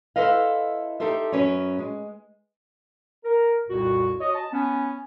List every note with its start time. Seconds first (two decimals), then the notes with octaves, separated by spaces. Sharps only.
0.16 E4 A4 B4 C5 D#5 F5
1.00 D#4 G4 A4 C5 E5
1.32 F#2 F#3 C#4 B4 C#5
1.79 G#3
3.24 A#4
3.69 C2 F2 A#2 F#4
4.20 F#4 C#5 D#5
4.35 A5
4.52 B3 C#4